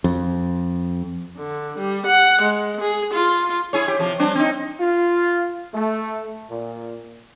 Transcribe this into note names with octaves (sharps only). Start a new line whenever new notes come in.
F2
D3
G3
F#5
G#3
G#4
F4
E4 G#4 C#5
G4
C3 F3
G3 C4 D4
C4 D#4
F4
A3
A#2